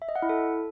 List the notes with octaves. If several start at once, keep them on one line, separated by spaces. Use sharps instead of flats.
E5
D#5
F#5
E4
A4